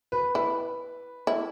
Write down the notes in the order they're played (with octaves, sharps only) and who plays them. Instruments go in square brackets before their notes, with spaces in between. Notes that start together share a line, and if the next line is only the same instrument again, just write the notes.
[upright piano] B4
[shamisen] E4 [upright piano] B4
[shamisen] E4